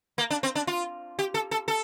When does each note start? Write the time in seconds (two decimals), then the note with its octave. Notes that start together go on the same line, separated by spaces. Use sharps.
0.18 A#3
0.30 D4
0.43 C4
0.55 D4
0.67 F4
1.19 G4
1.34 A4
1.51 A4
1.68 A4